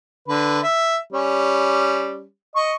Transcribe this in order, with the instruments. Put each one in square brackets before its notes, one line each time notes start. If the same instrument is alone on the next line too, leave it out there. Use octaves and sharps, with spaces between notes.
[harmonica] D3 B4
E5
G3 C#4
D#5 C#6